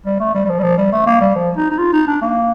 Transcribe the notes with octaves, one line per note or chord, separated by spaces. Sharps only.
G3
A3
G3
G3
F3
G3
F3
G3
A3
A#3
G3
F3
D#4
D#4
F4
D#4
D4
A#3